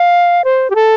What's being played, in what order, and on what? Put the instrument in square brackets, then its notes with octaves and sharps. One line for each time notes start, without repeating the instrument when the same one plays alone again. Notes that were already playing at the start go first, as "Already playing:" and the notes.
Already playing: [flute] F5
C5
G4
A4